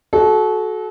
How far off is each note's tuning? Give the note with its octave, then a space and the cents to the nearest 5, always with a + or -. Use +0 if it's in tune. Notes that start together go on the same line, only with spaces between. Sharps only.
F#4 +0 A4 -30